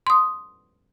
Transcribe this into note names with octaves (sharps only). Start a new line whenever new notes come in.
C6 D#6